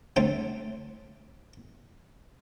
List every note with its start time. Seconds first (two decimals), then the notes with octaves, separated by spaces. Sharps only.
0.16 D3 A3 C4 C#4